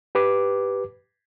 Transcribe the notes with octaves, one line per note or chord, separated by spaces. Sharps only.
G4 B4 D6